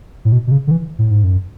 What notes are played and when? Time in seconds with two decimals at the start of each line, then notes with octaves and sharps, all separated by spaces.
0.25 A2
0.32 B2
0.47 B2
0.51 C#3
0.67 D3
0.71 E3
0.99 A2
1.11 G#2
1.24 F#2